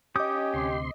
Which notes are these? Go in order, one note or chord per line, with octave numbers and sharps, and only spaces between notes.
C#4 G4 D#5 D6 D#6 G6
D2 C3 C6